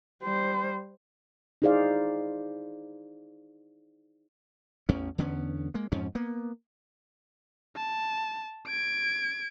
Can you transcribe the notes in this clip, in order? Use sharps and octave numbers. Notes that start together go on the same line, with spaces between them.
G3 C5
D#4 E4 G#4 C5 D5 F5
A1 E2 C#4
E2 D3 B3 C#4
G#3 A#3
F2 G#2 F3 C#4
A#3 B3
A5
G#6 D7